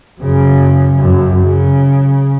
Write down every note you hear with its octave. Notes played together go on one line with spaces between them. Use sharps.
F#2 C#3
F#2
C#3